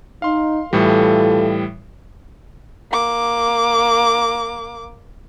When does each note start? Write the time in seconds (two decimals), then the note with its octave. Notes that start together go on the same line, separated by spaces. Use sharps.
0.22 D#4 F5 C6
0.73 A2 E3 G3 F4 A4
2.91 A#3 D6